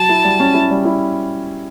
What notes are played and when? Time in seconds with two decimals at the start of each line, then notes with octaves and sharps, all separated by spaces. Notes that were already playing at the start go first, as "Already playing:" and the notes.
Already playing: F#3 A5
0.09 E4
0.24 G3
0.40 C#4
0.54 E4
0.71 G3
0.85 E4